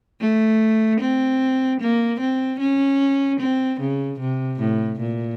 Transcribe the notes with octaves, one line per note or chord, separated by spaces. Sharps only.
A3
C4
A#3
C4
C#4
C4
C#3
C3
A2
A#2